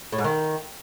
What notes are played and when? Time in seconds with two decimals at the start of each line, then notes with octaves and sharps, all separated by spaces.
0.12 A2
0.18 G#2
0.24 D#3